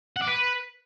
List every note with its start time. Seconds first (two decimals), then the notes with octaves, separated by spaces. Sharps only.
0.16 F#5
0.22 D5
0.27 B4